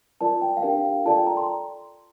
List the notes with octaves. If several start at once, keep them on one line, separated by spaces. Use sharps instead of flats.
F4 A#4 D5 A5
G5
F5
D4 G4 A#4 G5
F5
F5
F4 A4 D5 A5
G5
A#5
C6